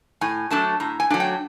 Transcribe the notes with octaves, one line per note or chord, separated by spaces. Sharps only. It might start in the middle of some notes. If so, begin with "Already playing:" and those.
A2 G#5
F#3 A3 D4 A5
A2 A#5
G#5
F#3 A3 D4
G5